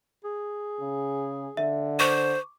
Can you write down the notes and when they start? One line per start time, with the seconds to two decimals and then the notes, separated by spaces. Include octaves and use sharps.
0.24 G#4
0.80 C#3
1.57 D3 E5
2.00 C5 C#6 D6